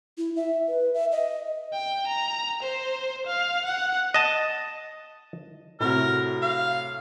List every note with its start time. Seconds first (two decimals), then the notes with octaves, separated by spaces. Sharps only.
0.18 E4
0.36 E5
0.68 B4
0.94 E5
1.12 D#5
1.73 G5
2.08 A#5
2.63 C5
3.27 F5
3.66 F#5
4.14 D#5 A5
5.80 A2 C3 F#4 A#4
6.42 F5